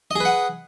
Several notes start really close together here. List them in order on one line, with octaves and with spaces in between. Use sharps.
D#5 G#4 B4 F#5